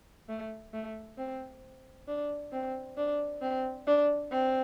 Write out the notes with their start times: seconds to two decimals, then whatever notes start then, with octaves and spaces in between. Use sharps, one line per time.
0.29 A3
0.73 A3
1.18 C4
2.08 D4
2.52 C4
2.97 D4
3.42 C4
3.87 D4
4.31 C4